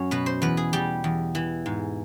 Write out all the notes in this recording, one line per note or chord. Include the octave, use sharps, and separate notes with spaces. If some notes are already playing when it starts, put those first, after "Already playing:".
Already playing: F#2 F#3 C#5
B2 B4
C5
E2 B4
G#4
G3 G4
E2
E3
G#2